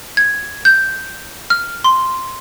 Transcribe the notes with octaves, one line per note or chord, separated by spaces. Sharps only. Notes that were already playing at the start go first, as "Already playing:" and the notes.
G#6
G6
F6
C6